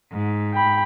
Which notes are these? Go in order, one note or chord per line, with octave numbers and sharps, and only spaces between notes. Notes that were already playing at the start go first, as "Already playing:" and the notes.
G#2
G5 B5